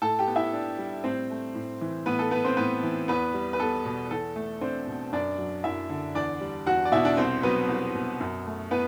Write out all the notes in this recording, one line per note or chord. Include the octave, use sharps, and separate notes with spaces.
A2 A4 A5
G4 G5
B3
E4 E5
D4
G3
A2 C4 C5
A3
A2
E3
A2 B3 B4
A4
B3 B4
C4 C5
A2 B3 B4
E3
E2 B3 B4
G3
B4
B3 A4
B2
E2 A4
A3
C4 D4 C5
B2
F#2 D4 D5
F#3
F#2 E4 E5
D3
E2 D4 D5
G3
E2 F#4 F#5
D5
B2 E4 E5
D4 D5
C2 C4 C5
F#3 B3 B4
C2
B2
F#2
A3
B3 E4 B4